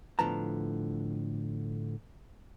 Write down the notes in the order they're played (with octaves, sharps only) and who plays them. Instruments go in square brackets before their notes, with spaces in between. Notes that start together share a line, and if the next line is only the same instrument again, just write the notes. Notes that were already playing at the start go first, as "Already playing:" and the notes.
[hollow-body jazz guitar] A2 D3 F3 B3 A5 A#5